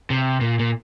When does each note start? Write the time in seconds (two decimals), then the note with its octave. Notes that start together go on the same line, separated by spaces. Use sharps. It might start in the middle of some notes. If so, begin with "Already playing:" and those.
0.10 C3
0.41 A#2
0.59 A#2